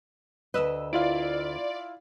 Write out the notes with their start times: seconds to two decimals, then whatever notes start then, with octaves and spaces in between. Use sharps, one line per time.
0.54 D2 B4 D#5 E6
0.93 E4 F4 D5 F5